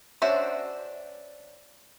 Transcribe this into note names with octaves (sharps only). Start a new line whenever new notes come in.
C#4 D4 F#4 C5 E5